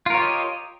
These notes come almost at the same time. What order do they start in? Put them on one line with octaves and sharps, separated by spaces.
F4 A#4 C#5 G4 D#5